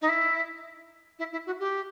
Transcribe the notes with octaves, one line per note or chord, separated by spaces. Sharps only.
D#4
E4
E4
E4
F#4
G4